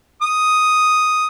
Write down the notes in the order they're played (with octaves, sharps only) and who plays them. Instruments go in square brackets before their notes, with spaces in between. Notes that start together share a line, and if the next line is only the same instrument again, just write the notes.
[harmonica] D#6